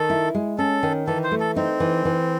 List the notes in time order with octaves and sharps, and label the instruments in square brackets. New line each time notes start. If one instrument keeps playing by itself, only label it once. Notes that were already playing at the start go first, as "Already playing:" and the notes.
Already playing: [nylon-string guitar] D#3 [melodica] A4
[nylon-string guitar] E4
G#3
[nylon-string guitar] C#4 [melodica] A4
[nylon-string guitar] D#3
[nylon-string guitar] E3 [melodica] A4
[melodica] C5
[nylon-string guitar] A3
[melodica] A4
[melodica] C4 [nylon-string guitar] D#4
[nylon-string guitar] E3
E3